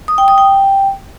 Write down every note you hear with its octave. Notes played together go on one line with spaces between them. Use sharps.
D#6
G5
D#6
G5